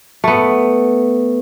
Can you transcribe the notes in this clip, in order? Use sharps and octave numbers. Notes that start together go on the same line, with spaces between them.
A3 B3